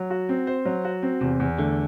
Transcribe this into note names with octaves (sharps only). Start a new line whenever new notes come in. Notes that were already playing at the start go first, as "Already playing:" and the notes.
Already playing: F#3
F#4
C4
C5
F#3
F#4
C4
E2 C3
E2
D3 A3